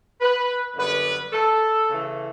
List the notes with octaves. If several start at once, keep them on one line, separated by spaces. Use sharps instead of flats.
B4
F#2 D3 G3 B3 B4
A4
C#3 E3 A3